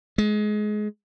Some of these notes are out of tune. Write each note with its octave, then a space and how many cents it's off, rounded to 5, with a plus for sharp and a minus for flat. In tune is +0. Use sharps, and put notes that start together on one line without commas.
G#3 +25